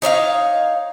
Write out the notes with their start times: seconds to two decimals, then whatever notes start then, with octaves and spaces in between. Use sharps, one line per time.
0.02 D#4 C#5 D5 F5